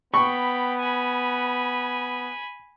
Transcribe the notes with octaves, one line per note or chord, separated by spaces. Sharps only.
B3 G5 B5 C#6
G#5 B5